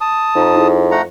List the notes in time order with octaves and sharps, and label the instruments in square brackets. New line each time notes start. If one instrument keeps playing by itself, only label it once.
[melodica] A5 D#6
[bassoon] F2 [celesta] D#4 A#5
[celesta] D#4 E4 G#4
[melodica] A3 F#5 A#5